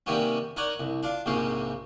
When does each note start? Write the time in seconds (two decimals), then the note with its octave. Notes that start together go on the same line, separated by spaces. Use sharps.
0.06 C3 D#3 G3 A#3 B3 C#4
0.56 D#4 A#4 C#5 D5 F#5
0.80 C2
1.03 D4 F4
1.26 A#1 G#2 C3 A#3 C#4 C6